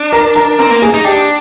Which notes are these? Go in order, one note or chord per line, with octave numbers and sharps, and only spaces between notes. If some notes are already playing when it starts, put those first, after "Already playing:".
Already playing: D4
A#4 A#5
A#4 A#5
C4 A#4 A#5
A#3
G#4 G#5
D#4
D4 G4 G5